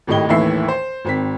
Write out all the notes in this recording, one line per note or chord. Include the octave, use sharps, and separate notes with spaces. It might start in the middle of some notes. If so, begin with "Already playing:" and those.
G#1 A2 G4 D#5 G7
A1 D#2 A2 E3 E5 C7
C5
G#1 C4 B6